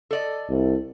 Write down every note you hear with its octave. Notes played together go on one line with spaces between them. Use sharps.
A4 D5 D#5
C2